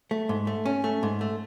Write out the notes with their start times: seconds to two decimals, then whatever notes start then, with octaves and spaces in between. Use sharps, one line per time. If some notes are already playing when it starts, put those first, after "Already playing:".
0.11 A3
0.29 G#2
0.47 A3
0.65 C#4
0.84 A3
1.03 G#2
1.21 A3